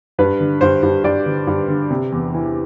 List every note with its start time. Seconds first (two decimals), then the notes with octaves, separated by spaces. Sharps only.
0.18 G2 B4
0.40 D3
0.61 G2 C5
0.83 G2
1.04 G2 D5
1.26 D3
1.47 G2
1.68 D3
1.91 C3
2.12 E2
2.34 E3